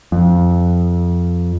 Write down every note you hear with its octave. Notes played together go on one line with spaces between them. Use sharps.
F2